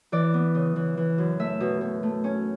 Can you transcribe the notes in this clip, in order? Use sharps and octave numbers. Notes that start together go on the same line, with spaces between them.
E3 D5
B3
C#3
E3
E3
F#2
A3 E5
B2
B2
A3
C#4